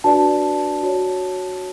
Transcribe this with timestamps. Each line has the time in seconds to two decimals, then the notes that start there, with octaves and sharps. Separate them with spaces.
0.04 D4 F#4 B4 D5 A5
0.83 F#4 C#5